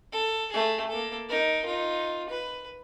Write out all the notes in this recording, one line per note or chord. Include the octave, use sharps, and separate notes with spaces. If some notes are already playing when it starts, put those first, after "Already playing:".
A4
A3 G#4
A#3 A4
D#4 A#4
D#4 F4
B4